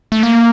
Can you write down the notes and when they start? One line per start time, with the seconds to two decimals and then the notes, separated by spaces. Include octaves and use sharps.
0.12 A3
0.23 A#3